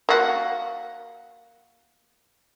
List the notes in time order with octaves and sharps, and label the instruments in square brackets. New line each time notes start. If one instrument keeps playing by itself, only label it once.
[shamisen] A#3 F#4